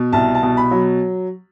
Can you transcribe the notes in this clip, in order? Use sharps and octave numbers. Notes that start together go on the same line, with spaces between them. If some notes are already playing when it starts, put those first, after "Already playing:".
Already playing: B2
C2 A5
A5
B2
B5
F#3